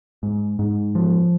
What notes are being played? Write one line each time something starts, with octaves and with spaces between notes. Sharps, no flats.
G#2
G#2
F3